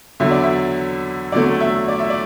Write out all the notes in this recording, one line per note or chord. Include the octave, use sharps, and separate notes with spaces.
E2 D3 F#3 E5
D5
E5
E2 D3 F#3 A3 D5
E5
D5
E5
D5